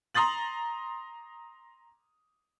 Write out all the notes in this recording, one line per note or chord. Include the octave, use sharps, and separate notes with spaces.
A#5 C6 D#6 A6 F#7